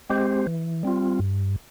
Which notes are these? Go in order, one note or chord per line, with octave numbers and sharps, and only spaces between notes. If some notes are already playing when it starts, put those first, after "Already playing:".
G#3 C4 G4 C5
E3
G3 C4 F4
G2